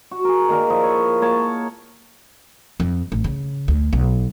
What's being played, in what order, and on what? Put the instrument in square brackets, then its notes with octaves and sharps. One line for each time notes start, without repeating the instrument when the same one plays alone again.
[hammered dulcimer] F#4
G#4 A#4
D#3 A#3 A#4 D5
F3 E4 D#5
C#5
A#3 C#5 F#5 A5
[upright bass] F2
A1
C#3
D2
B1